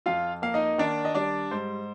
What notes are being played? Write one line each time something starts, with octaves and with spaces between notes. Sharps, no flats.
F2 F4 F5
A#3 F5
D#4 D#5
D#3 D4 D5
D#5
G3 D4 D5
G#2 C5